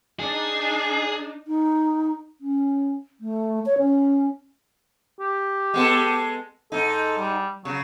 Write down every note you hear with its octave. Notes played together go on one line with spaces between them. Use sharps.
D4 D#4 G#4
D#4
C#4
A3
C#5
C#4
G4
G#3 B3 A4
G#2 D#4 A4
G3
C#3 F#3